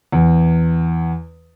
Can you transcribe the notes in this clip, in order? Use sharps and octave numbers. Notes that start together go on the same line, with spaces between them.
E2